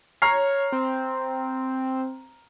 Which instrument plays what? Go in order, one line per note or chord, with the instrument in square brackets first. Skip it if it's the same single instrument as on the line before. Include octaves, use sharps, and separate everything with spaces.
[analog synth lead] C#5 [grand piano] A#5 F6 C7
[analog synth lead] C4